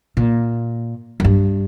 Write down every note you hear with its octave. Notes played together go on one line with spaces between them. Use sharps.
A#2
F#2
G2